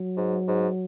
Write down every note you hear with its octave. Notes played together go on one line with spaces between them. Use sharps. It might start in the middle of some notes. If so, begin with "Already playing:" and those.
Already playing: F#3
G#2
G#2